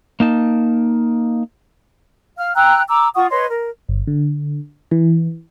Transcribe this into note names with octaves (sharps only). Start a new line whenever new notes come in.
A#3 D#4 A5
F5 F6
G5 A#5 E6 F#6
A#5 D6 E6
F4 F#5 C#6 D#6
B4 C#5 D#5 C6
A#4
G1
D3
E3